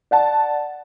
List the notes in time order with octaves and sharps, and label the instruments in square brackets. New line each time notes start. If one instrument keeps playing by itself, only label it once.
[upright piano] D5 F#5 A5